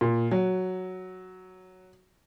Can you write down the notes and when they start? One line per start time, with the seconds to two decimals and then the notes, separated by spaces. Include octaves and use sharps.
0.01 A#2
0.31 F#3